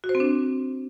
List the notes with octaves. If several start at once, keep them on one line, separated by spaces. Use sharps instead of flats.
F#4
C5
C4
D4